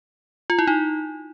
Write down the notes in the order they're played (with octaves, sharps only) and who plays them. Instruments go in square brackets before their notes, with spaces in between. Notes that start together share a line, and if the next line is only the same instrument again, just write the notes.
[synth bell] F4
E4
D#4